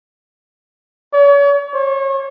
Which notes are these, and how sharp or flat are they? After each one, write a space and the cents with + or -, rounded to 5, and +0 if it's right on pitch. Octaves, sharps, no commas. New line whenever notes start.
C#5 +40
C#5 -35